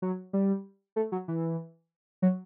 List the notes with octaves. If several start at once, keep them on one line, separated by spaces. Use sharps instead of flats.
F#3
G3
A3
F#3
E3
F#3